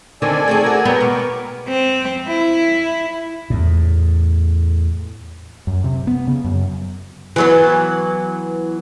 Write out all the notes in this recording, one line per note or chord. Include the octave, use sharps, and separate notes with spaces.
D3 D#3 C4 A4 D5 G#5
A3 C4 G#4
F#4 A#4
F#3 B3 G5 A#5
B2 A#4 C#6 D6
C4
E4
E2 A2
F#2
C3
B3
C#3
F#2
E3 F#3 B3